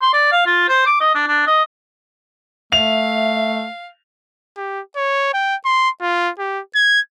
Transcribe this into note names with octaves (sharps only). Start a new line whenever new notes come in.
C6
D5
F5
F4
C5
D6
D#5
D4
D4
D#5
A3 E5 F5 F7
G4
C#5
G5
C6
F4
G4
G#6